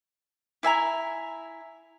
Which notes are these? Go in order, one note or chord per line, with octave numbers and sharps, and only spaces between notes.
E4 E5 G#5 A#5